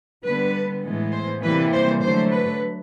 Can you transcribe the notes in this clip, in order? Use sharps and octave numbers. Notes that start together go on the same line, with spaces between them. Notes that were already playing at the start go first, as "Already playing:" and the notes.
D3 G3 B3 B4
A2 E3 G#3 B3
C5
C3 E3 G3 A#3 B4
C5
D3 F#3 A3 C5
B4